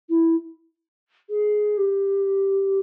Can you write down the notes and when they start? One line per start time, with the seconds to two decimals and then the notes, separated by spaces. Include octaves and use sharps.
0.09 E4
1.30 G#4
1.78 G4